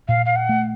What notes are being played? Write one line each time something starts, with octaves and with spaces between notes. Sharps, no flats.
A#2 F5
F5
F#5
A3